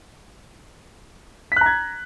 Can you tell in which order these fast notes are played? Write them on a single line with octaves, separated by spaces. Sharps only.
B6 F#6 A#5 G#6